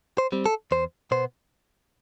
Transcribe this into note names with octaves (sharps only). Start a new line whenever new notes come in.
C5
G3 C4
A4
E2 C5
B2 B3 C5